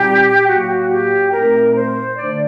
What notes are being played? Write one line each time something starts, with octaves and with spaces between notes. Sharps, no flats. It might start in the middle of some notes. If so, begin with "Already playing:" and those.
Already playing: A#2 G3 C4 D#4 G4
A2 F#3 A#3 F#4
G4
A#2 A3 C4 D#4 A#4
C5
D3 A3 D4 D5